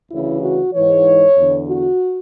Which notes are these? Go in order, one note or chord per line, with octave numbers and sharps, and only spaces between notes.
D2 C#3 E3 E4
F#4
G#2 E3 C#5
E2 D3
F#4